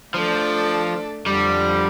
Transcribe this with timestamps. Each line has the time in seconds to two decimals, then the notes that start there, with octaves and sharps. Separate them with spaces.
0.14 F3 A3 D4 A4 D5
1.26 F2 D3 F3 G3